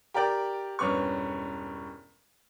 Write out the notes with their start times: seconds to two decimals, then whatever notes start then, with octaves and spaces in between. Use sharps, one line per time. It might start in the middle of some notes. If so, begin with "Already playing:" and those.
0.14 G4 A#4 D5 G5
0.79 E1 G2 C#4 B4 C#6